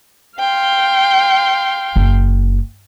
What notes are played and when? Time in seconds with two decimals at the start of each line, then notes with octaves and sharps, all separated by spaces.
0.39 F5 G5 C6
1.96 F#1